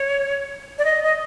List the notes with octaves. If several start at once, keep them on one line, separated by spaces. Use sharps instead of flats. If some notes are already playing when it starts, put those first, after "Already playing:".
Already playing: C#5
D5
D#5
D#5